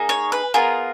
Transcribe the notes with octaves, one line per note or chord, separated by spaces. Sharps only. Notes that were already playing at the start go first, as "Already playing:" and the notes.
Already playing: A#3 D#4 G#4
C#5
B4
B3 F4 G#4 A#4